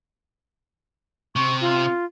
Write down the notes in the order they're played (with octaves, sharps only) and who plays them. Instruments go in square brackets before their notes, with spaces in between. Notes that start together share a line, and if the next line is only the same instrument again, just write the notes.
[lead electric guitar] C3 [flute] C#6
[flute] F4